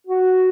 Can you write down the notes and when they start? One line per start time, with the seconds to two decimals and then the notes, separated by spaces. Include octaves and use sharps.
0.07 F#4